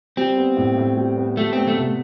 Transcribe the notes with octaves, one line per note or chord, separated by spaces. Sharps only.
G3 C4
B3
A2
A2
G3
B3
G3 A3
B3 C4
A3
C3